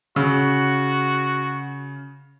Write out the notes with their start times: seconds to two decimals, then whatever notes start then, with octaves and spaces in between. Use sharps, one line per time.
0.16 C#3 F#4